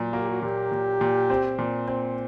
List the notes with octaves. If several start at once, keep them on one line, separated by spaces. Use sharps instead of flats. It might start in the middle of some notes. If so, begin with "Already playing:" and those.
Already playing: A#2 F#3
A#3 F#4
G4
F#4
A#2 G4
A#2
A#2
C4
A#2
C4